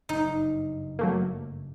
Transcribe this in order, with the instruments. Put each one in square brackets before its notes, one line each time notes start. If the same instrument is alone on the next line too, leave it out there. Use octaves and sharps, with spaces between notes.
[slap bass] F#1 G2 [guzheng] D#4
[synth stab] F#3 A3 A#3